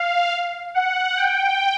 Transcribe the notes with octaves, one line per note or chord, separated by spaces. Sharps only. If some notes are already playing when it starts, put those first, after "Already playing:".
Already playing: F5
F#5
G5